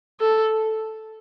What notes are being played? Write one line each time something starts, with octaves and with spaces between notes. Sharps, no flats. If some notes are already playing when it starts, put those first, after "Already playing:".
A4